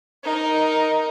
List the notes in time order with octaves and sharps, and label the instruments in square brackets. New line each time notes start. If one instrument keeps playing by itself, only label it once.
[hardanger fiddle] D#4 A#4